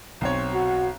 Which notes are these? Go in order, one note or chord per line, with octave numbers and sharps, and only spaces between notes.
B1 C4 C#5
F#4